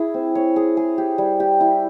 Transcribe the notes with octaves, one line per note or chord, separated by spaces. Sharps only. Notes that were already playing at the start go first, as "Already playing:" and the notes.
Already playing: E4 G#4
C4
C#5
G#4
G#4
G4
G3
G4
E4